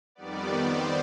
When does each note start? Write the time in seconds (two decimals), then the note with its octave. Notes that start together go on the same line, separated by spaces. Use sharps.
0.15 F2 D#3 G3 B3 D5
0.66 C5